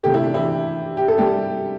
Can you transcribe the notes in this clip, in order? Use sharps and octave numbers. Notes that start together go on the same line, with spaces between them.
C3 A3 G4
E4
D4
E3 E4
G4
A4
G3 G4